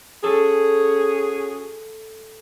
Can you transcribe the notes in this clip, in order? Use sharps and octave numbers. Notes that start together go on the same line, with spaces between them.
C#4 F#4 G#4 A4